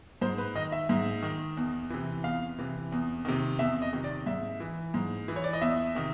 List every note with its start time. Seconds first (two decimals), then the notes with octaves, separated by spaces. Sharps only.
0.21 G#2 C5
0.38 B4
0.55 D#3 D#5
0.72 E5
0.89 G#2
1.23 D#3
1.57 E2
1.90 C3 E3
2.24 E2 F5
2.58 C3 E3
2.92 E2
3.25 C3 D#3
3.59 E2 E5
3.82 D#5
3.93 C3 D#3
4.04 D5
4.26 G#2 E5
4.60 E3
4.94 G#2
5.28 E3
5.36 C#5
5.44 D5
5.53 D#5
5.61 E2 E5
5.95 C3 D#3